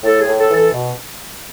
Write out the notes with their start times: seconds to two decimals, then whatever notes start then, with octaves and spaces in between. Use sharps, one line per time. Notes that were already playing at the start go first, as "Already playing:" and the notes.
0.03 A2 A4
0.20 G#4
0.27 A2
0.38 A4
0.49 E3
0.54 A4
0.72 B2